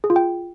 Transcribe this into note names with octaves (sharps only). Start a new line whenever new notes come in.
G#4
F4
G5